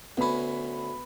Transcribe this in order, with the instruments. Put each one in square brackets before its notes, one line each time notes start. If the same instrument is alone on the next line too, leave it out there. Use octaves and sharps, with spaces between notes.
[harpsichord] D2 C#4 [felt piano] B3 B5